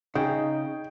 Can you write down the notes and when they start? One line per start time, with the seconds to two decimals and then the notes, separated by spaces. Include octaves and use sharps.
0.15 C#3 D#4 G#4 G5